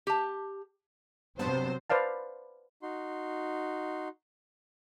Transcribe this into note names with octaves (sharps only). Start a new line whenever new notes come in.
G4 A5
G2 C3 F#3 B3 C5 A5
B4 C5 D5 F5 A5
D#4 F#4 C6